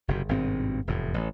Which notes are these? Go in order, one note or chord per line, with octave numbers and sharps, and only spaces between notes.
F#1 C3
G#1 G2 B2 C4
F1 E2 A2
A1